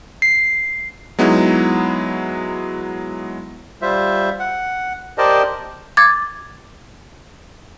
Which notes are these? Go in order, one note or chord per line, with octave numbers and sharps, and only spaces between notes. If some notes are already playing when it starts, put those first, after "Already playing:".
C7
F#3 G#3 B3 D#4 E4
G3 F4 C5 E5
F#5
G4 A#4 C5 D5 D#5 A5
D6 G#6 A6